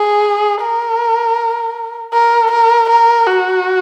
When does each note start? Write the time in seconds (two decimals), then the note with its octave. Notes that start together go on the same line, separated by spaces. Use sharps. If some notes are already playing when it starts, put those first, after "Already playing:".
Already playing: G#4
0.62 A#4
2.13 A#4
2.52 A#4
2.90 A#4
3.27 F#4